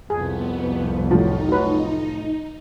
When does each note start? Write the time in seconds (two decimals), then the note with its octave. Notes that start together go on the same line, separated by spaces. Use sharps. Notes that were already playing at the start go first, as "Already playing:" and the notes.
0.10 C2 F2 B3 G#4
1.11 A2 F3 F#3 D#4
1.48 F#3 B4